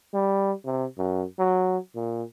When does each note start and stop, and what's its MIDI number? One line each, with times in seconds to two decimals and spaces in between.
0.14 0.52 55
0.65 0.85 48
0.98 1.24 42
1.39 1.78 54
1.95 2.23 46